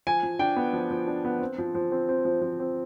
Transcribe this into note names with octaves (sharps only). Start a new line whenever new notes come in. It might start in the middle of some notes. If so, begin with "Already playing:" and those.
F3 G#5
F3
D4 G5
B3
F3
F3
D4
B3
C4
F3
F3
C4
C4
F3
F3
C4